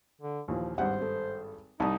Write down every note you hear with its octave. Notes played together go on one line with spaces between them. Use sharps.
D3
D#2 A#2 E3 F3
G#1 G2 G4 C5 F#5
A4
C2 D#4 D5 A5 D#6